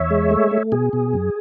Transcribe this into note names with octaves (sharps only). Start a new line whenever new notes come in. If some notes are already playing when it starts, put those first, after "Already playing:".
Already playing: E2 C#5 E5
G#3
A3
A3
B2 G#4
B2
F#2